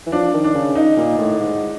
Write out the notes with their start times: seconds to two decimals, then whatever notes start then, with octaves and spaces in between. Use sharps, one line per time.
0.07 E3
0.12 F3 D4
0.34 D#3
0.44 D4
0.55 C#3
0.75 D#4
0.97 A#2
1.18 A2
1.39 G#2